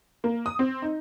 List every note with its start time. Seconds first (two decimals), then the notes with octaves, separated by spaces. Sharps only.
0.24 A#3
0.46 D#6
0.59 C4
0.82 D#4